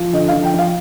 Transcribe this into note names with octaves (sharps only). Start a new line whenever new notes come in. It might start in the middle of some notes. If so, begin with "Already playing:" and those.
Already playing: F3
D3 D#5
F5
F3
G5
F3 F5